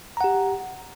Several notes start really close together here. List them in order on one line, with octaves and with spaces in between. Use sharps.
A#5 F#5 G4